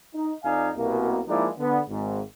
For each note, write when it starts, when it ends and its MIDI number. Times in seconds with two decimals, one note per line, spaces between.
0.14 0.33 63
0.44 0.70 41
0.44 0.70 63
0.44 0.70 74
0.44 0.70 77
0.44 0.70 80
0.76 1.20 36
0.76 1.20 47
0.76 1.20 58
1.28 1.48 53
1.28 1.48 56
1.28 1.48 58
1.28 1.48 63
1.28 1.48 64
1.28 1.48 74
1.58 1.79 50
1.58 1.79 59
1.88 2.20 32
1.88 2.20 44